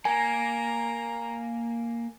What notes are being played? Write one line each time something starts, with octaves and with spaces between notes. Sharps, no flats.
A#3 G#5 A#5